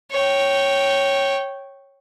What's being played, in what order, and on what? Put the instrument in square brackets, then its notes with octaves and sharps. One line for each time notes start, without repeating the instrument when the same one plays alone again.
[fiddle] C#5 G5